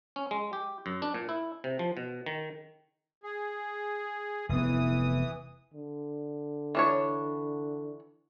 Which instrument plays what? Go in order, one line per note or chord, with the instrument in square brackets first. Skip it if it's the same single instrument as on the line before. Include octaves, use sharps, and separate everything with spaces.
[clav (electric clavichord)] C#4
G#3
G4
F#2
D4
A#2
E4
C3
F3
B2
D#3
[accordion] G#4
[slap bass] F1 B3 [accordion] E3 D#6
[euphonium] D3
[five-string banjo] E3 D4 C#5